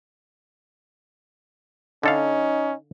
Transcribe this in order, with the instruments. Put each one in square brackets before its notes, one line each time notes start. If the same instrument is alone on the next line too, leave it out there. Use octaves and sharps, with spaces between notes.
[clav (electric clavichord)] D3 A4 F5 [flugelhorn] C#4 [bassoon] D#4